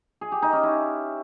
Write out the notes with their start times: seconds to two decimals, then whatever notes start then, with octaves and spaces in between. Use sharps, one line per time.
0.21 G#4
0.32 G4
0.42 D#4
0.53 C#4
0.63 E4